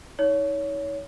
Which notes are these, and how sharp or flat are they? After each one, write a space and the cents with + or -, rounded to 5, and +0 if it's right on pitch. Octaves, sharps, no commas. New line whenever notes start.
D#4 +35 C#5 +20